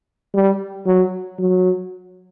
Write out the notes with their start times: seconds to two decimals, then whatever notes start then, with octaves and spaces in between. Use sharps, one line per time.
0.34 G3
0.86 F#3
1.39 F#3